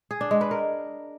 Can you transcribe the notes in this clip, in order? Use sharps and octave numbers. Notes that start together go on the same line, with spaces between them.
G#4
D4
G#3
B4
A#4